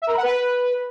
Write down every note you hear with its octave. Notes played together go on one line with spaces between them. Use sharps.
E5
A#4
B5
F#5
B4